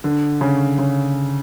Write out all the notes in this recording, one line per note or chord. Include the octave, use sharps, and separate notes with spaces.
D3
C#3
C#3